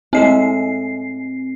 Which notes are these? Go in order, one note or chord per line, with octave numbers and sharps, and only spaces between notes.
A2 G#3 C4 E5 C7